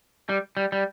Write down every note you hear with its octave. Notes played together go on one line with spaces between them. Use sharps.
G3
G3
G3